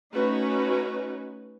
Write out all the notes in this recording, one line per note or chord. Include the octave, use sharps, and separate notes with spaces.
A3 C#4 D#4 F#4 B4